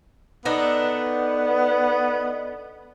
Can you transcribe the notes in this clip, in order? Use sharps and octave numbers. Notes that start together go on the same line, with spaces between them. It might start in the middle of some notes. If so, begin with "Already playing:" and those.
B3 D4 D#4 A4